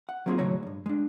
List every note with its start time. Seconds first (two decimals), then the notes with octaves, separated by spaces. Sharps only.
0.09 F#5
0.26 F#3 A#3 C4 D#4 F4 G#4
0.38 D#2 A2 C#3 F#3 C#5 A#5
0.63 B1 G2
0.86 G#3 D4